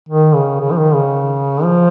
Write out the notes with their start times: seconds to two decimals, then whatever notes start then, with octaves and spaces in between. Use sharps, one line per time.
0.09 D#3
0.35 C#3
0.60 C#3
0.71 F3
0.78 D#3
0.95 C#3
1.64 F3